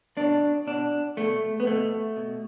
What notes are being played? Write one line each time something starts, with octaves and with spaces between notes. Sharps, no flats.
B2 D4
B2 D4
B2 A3
B3
B2 A3
B2